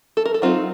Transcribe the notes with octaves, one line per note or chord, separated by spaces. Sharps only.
A4
A#4
A4
F#3 C4 D#4 F4